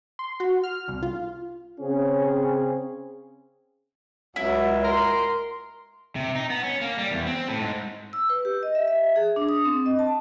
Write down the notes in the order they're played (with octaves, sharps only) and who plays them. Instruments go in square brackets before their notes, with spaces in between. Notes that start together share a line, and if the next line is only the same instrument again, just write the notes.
[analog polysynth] C6
F#4
F6
C2
F4
[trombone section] C#3 C4 C#4 G#4
[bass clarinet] C#2 [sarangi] F#3 [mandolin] E4
[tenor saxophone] A#4 [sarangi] C6
[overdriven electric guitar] C3
D#4
B3
C#4
A#3
G3
E2
C4
A2
G#2
[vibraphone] E6
B4
G4
D#5
E5
E5
G#4
D4
D#6
C4
D#5
A5